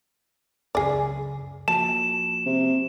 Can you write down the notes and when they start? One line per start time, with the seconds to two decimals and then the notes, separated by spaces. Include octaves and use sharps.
0.75 C#2 F#2 C#3 G#4 D5
1.68 F3 A#3 F#4 A5 E7
2.46 C3